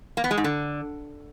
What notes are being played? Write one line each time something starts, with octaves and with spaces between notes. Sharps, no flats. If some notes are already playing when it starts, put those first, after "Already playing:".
A#3
B3
G#3
G#2
D3